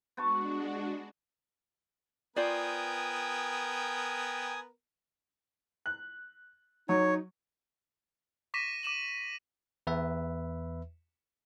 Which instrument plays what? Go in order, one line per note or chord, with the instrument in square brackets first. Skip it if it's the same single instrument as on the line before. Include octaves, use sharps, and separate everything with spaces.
[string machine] G#3 D4 F#4 [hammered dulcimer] B3 A5 C#6
[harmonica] B3 A#4 [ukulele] F4 C5 D5 [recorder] G5 [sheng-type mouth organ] G#5 D#6
[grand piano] F#6
[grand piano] F#3 [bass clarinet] D#4 [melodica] C#5
[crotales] C#6 D6 A#6 B6 D#7 E7
D6 D#7 E7 F#7
[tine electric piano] E2 B4 E5